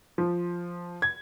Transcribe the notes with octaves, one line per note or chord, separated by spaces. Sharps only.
F3
G#6